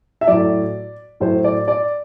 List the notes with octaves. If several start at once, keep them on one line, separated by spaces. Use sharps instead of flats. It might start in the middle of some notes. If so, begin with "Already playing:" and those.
E5
A2 F#3 D5
A2 F#3 C5
D5
D5